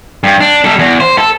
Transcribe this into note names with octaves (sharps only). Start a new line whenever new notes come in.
G2
D4
G3 A4
E2
C5
A4